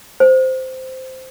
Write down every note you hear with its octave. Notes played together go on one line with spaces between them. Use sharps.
C5